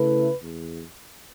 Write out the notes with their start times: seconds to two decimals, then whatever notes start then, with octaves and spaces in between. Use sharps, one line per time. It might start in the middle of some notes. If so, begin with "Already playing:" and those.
Already playing: C#3 A3 E4 B4
0.38 E2